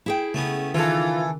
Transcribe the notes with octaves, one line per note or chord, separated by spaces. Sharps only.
E4 G#4 G5
C#3 A3 B3 C#4
D#3 E3 F4 A4 F5